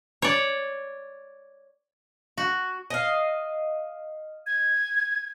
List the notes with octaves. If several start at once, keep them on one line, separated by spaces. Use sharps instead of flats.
C#5 D5
F#4
D#5 F5
G#6